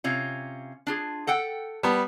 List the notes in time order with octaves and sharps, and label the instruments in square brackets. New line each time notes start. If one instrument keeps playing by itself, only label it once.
[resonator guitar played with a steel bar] C3 C#4 F4
D4 F4 G#4
A4 F#5 G5
[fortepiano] G3 B3 [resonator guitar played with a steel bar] A5